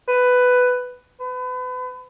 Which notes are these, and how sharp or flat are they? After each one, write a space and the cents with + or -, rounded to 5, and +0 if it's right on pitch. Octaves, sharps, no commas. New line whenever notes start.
B4 +10
B4 +35